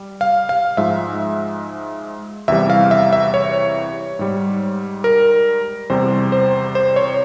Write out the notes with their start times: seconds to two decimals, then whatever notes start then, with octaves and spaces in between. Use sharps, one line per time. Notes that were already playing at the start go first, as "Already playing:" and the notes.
Already playing: G3
0.21 F5
0.49 F5
0.77 G#2 F3 G#3 E5
2.48 E2 C3 E3 G3 E5
2.70 F5
2.91 E5
3.13 E5
3.34 C#5
4.19 G#2 G3
5.04 A#4
5.90 E2 C3 G3 C5
6.32 C5
6.75 C5
6.96 C#5